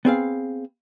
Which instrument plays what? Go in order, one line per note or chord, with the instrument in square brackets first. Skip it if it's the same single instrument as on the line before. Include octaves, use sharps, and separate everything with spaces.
[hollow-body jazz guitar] B3 C4 G#4 F5